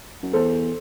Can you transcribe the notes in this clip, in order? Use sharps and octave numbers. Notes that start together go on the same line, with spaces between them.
F#2
E2 A4 C5